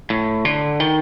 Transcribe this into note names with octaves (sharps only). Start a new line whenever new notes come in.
A2
D3
D#3